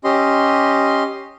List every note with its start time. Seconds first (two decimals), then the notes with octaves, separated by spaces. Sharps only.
0.04 C#4 G4 D#5 C6